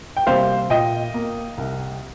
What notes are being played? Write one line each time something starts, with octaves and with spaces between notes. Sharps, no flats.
G5
C3 G3 A#3 C5 F5
A#2 D#5 G5
A#3
C2